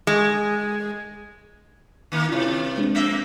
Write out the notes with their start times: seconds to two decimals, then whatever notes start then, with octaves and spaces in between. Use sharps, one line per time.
0.07 G#3
2.12 D#3 A#3
2.29 G2 C3 E4 F4 D5
2.78 G#3 C4 D4
2.95 F2 A#3 E5